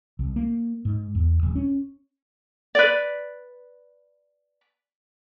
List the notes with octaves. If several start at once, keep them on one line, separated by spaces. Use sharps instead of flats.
C2
A#3
G#2
E2
D#1
C#4
B4 D5